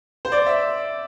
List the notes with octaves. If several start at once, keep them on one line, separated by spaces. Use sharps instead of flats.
C5
D5
E5